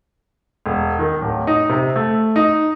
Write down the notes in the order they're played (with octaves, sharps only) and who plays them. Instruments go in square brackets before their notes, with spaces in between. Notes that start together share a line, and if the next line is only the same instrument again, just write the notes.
[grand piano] E1
D#3
D1
D#4
C3
A3
D#4